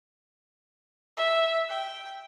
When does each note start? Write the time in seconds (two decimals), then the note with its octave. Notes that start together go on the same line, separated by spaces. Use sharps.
1.17 E5
1.69 G5